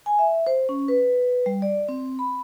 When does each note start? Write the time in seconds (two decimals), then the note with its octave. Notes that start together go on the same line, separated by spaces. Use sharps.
0.06 G#5
0.19 E5
0.47 C5
0.69 C#4
0.88 B4
1.46 G3
1.62 D5
1.88 C4
2.19 B5